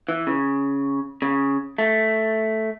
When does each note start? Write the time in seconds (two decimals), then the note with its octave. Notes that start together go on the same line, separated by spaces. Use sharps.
0.09 E3
0.27 C#3
1.22 C#3
1.78 A3